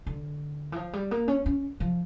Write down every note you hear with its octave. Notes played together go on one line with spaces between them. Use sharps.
D3
E3
F3
G3
A#3
C#4
C#4
F3